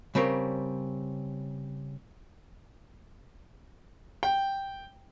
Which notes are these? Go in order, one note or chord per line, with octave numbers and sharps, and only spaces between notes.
C#3 G3 C4 A#4 C#5
G5